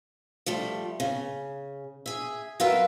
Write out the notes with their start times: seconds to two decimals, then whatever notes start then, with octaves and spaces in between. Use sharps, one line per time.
0.46 F3 G3 A3
1.00 C#3
2.06 G#4 E5
2.60 F#3 F4 A#4 B4 E5 F5